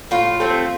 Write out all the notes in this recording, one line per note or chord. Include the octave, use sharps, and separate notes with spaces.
A2 F4
F3 A3 C4